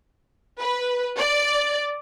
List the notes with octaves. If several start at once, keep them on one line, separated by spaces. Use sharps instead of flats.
B4
D5